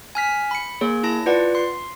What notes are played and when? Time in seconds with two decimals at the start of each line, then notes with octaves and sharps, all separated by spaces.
0.15 G#5 F6 B6
0.51 B5 C#7
0.81 A#3 G#4 C#5
1.03 E4 A5 A#6
1.26 F4 B4 D5 F#5
1.55 C6